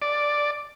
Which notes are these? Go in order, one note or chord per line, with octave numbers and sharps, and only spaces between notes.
D5